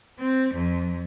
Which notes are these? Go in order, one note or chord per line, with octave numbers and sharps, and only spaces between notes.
C4
F2